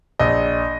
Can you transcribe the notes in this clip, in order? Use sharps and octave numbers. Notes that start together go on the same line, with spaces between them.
A#1 D#5